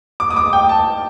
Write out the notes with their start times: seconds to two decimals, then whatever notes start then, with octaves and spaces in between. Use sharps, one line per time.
0.20 D6
0.31 D#6
0.36 D6
0.53 G5
0.69 A5